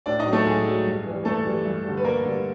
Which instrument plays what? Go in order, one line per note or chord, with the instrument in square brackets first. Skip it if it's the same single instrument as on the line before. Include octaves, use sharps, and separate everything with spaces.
[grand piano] A2 D4 D5
D#4 D#5
F#3
A3 A4
A2 G#3 G#4
F#3
G2
E3 G3
G2 A3 A4
E3 G3
G2
D3 G3
B4
G2 A#3 A#4
D3 G3